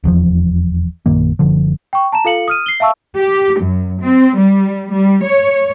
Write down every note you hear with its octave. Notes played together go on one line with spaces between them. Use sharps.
F1 E2 A#2 F3
A#1 F#2 D#3 A#3
F#1 D3 F3
G5 C#6
A5 A#5 E7
F4 A4 F5 C#7 F#7
D#6 F6 D#7
C7 G7
E5 F5 A5 C#6 E6
G4
F#2
C4
G3
G3
C#5